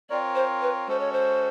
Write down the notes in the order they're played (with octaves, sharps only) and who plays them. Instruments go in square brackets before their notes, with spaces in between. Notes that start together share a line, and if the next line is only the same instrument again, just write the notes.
[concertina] C4 F4 A#4 C#5 [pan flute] D5
[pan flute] C5
B4
[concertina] G#3 C#4 F#4 A4 [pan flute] C5
[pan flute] C#5
C5